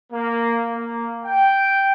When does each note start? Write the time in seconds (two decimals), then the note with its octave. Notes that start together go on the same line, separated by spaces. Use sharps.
0.12 A#3
0.75 A#3
1.25 G5